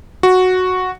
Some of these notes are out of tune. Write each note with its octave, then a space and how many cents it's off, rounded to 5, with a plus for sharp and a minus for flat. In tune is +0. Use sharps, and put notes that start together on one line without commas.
F#4 -5